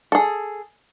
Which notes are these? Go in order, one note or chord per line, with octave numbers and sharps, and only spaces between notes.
G#4 A4